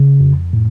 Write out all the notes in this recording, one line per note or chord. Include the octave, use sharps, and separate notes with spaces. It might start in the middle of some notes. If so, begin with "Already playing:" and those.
Already playing: C#3
F2
A2